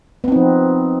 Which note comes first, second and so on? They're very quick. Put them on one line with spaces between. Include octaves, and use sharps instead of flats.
B3 C4 D#4 F3